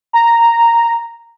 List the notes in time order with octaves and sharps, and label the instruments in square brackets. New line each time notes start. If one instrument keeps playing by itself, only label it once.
[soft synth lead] A#5